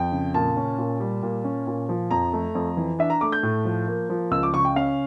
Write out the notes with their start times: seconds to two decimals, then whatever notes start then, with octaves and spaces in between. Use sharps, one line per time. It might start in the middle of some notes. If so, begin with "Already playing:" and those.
Already playing: F2 G5
0.12 C#3
0.34 A#2 A5
0.57 C#4
0.78 A#2
1.00 G3
1.23 A#2
1.44 C#4
1.67 A#2
1.89 F3
2.11 F2 A#5
2.33 A3
2.55 F2
2.77 E3
2.99 D4 E5
3.10 A#5
3.21 A3 D6
3.32 G6
3.43 A2
3.65 F3
3.87 A#3
4.10 F3
4.31 C#2 E6
4.43 D6
4.54 C#3 C#6
4.65 G5
4.76 C#4 F5